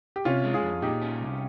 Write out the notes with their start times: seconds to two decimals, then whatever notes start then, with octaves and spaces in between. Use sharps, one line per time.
0.16 G4
0.25 C3 C#4 F4
0.44 G#3
0.54 F4 G#4
0.63 F2
0.82 A#2 D#4 G4
1.02 C#4
1.20 C2